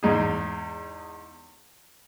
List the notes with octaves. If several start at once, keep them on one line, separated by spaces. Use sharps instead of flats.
E2 G#2 D#4 G#4